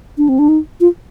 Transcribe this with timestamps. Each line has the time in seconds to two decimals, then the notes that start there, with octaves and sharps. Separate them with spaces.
0.18 D4
0.29 C4
0.39 D4
0.49 D#4
0.80 F4